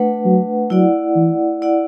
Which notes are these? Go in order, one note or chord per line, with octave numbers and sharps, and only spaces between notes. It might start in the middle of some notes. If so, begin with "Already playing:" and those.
Already playing: A3 D4 B4 F#5
F#3
F#3 E4 D5 F#5
E3
E4 D5 F#5